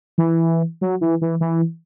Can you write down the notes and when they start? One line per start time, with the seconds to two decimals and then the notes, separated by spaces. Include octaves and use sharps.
0.18 E3
0.81 F#3
1.01 E3
1.21 E3
1.41 E3